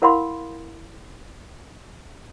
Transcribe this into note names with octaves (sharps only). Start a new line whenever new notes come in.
E4 A#4 F5 F#5 B5 C6